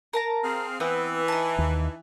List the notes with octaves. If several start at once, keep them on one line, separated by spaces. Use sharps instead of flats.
A#4 A5 A#5
C4 G#4 F5
E3 B3 C4 B4
D#4 A5
D#2